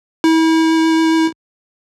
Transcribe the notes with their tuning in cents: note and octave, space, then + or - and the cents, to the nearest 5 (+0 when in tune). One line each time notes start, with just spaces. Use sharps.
E4 -35